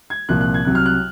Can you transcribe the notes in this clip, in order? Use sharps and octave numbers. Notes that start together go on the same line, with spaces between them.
G#6
C2 A#2 F3 F#6
F#6
G#6
C2 C3 F#3 F#6
F6
F#6